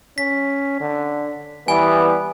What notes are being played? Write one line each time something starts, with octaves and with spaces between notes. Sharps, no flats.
C#4 B6
D3
E3 G3 B3 G#5